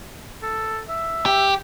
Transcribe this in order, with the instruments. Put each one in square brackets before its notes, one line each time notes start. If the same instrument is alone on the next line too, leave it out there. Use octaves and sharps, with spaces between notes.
[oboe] A4
E5
[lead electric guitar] G4